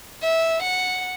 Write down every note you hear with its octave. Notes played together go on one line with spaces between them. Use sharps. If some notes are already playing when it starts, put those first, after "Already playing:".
E5
F#5